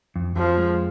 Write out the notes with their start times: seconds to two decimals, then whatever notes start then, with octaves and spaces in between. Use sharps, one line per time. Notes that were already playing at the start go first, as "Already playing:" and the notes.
0.16 F2
0.36 F2 F3
0.58 G#3